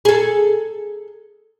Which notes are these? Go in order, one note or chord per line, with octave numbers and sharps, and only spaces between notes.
G#4 A4